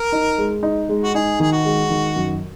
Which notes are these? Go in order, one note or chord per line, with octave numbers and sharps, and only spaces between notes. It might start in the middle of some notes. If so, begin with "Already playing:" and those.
Already playing: A#4
D#4
G#3
D#4
G#3
F#4
D#4 G#4
D#3 G#4
F#4
G#3
D#3
F#2